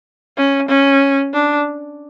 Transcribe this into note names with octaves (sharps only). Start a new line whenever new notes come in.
C#4
C#4
D4